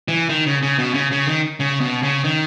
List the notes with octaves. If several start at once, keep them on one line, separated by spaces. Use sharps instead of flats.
E3
D#3
C#3
C#3
B2
C#3
C#3
D#3
C#3
B2
C#3
D#3